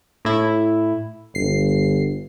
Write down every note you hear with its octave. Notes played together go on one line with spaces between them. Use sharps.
A2 E4
G1 C7